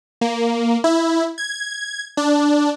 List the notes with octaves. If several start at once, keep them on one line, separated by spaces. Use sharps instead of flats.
A#3
E4
G#6
D4